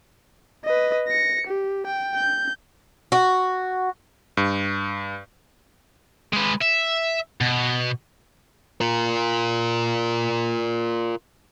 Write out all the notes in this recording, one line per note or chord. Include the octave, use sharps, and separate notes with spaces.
B4 D#5
A#6 C#7
G4
G5
G6
F#4
G2
G#3 B4
E5
B2
F4 A#4